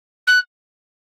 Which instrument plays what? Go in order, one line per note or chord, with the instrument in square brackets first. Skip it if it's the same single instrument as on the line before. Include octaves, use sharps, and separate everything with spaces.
[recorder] F#6